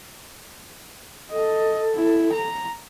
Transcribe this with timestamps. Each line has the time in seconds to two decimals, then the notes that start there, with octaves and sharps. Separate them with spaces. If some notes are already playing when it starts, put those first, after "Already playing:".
1.31 A4 D#5
1.96 E4
2.33 A#5